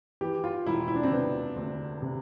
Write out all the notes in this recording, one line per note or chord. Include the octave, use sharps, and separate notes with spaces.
E3 G4
F4
E1 E4
E4
D4
C4
C3 B3
D2
C3